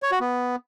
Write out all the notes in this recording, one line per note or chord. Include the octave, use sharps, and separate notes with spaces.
C#5
F#4
B3